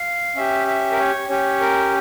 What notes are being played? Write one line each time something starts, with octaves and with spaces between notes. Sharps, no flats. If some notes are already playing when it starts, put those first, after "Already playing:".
Already playing: F5
C#4 G4 E5
E5
A#4
C#5
C#4 G4 C#5
A#4